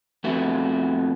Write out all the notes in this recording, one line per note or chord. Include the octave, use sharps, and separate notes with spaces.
F2 A3 B3 F#4